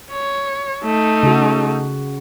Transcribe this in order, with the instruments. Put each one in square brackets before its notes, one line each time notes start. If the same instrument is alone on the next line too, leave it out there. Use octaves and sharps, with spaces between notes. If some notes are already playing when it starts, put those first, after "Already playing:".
[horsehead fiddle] C#5
A3 D#4
[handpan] C#3 F#4